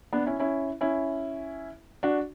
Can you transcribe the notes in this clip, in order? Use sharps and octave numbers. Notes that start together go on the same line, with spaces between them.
B3 D4
C#4 E4
C#4 E4
C#4 E4
D4 F#4